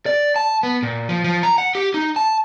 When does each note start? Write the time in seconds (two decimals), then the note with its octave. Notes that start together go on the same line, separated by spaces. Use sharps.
0.06 D5
0.36 A5
0.63 B3
0.83 A#2
1.09 F3
1.24 F3
1.43 A#5
1.58 F#5
1.75 G4
1.94 D#4
2.16 A5